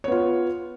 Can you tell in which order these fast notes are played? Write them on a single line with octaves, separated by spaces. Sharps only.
C#5 B3 F4